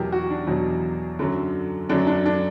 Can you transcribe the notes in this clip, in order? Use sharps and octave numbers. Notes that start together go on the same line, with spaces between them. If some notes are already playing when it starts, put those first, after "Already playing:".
Already playing: E2 B2 F#3 G4 A#4
F#4
D4
E2 B2 F#3
F#2 D3 F#3
F#2 D3 F#3 D4
D4
D4